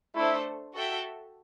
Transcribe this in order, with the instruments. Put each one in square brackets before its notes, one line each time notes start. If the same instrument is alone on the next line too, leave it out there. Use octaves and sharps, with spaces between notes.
[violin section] A3 D4 A4 C5 [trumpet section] E4
[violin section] F#4 A4 E5 G5